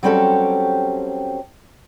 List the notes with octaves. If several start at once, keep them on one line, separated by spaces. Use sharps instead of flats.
F#3 G3 C4 C#4 G4 A4